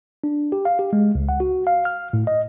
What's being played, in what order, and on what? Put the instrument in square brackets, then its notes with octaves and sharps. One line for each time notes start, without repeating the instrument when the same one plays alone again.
[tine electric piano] D4
G4
F5
G4
G#3
C#2
F#5
F#4
F5
F6
A2
D#5